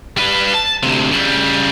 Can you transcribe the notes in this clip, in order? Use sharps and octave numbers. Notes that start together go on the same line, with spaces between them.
G3 B4
A5
D2 C3
C#3 G3